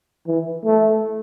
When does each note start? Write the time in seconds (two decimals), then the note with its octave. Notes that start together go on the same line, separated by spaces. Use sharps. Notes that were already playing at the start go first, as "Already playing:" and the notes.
0.27 E3
0.65 A3